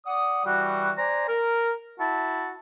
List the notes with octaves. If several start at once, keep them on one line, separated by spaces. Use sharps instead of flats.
D5 F#5 D#6
E3 G3 F#4
C5 D5 G#5 A#5
A#4
E4 F#4 A5